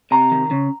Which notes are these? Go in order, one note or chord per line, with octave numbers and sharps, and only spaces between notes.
C3 A#5
D#3
C#3